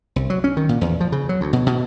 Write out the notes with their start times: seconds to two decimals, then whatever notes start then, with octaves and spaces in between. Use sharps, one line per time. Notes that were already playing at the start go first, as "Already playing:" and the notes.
0.16 C2
0.30 F#3
0.44 C#4
0.57 D#3
0.69 A#2
0.81 E2
1.01 F3
1.12 C#3
1.29 F#3
1.41 D2
1.53 B2
1.66 B2